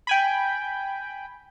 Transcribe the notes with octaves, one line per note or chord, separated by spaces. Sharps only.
G5 G#5 B5